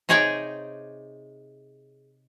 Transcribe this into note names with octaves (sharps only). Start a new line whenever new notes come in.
C3 D#4 G#4 C#5 D5 G5